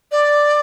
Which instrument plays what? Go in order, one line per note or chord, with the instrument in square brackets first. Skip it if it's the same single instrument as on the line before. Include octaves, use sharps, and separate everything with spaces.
[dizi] D5